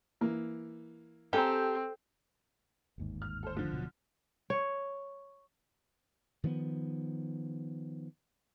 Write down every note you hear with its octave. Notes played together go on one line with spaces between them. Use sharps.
E3 A#3
C4 G4 A4 G#5 A#5
G1 D#2 G#2
F6
A4 C5
D3 F3
D1 B2 F#3
C#5
D#3 F3 A3 B3